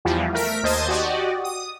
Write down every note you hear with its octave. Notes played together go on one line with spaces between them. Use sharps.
E2 E3 F3 G3
A3 A#4 B6 D7
D#2 C5 D#5 A5 G#6 D#7
F#4 G4 D5 D#5
D#6